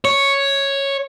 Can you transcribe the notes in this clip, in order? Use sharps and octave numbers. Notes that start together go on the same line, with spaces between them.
C#5